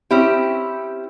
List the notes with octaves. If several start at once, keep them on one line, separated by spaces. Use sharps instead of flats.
C4 C#4 E4 G4